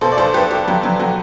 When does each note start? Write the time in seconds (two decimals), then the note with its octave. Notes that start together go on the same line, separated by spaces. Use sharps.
0.01 B2 A4 C5
0.12 D5
0.17 B1 A4 C5
0.34 B1 G4 B4
0.51 B1 G4
0.68 F#3 G4
0.83 F#3
1.00 F#3 F#4